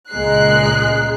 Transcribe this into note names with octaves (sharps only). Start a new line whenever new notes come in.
C#2 A#2 G#3 A#4 F#6 C7